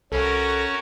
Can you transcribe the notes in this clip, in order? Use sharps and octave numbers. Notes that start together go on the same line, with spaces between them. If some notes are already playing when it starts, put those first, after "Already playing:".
C2 C#4 F#4 A4 A#4